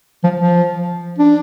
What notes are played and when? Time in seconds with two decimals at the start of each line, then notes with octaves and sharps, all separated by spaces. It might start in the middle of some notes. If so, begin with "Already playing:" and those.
0.24 F3
0.40 F3
1.19 D4